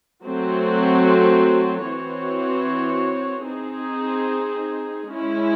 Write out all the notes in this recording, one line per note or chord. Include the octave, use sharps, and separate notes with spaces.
F#3 A3 C4 F#4
E3 C4 F#4 C#5
C4 D#4 G#4
G#3 C#4 E4